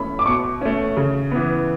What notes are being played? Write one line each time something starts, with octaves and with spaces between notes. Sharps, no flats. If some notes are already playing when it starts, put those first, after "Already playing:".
Already playing: E3 A3 C#4 B5
D6
B2 C#6
A3 C#4
C#3
E3 B3